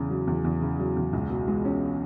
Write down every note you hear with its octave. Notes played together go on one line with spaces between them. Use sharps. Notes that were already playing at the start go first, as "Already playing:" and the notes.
Already playing: E2 C#3
F#3
E2
E2
C#3
F#3
E2
C#2
B2
G#3
C#4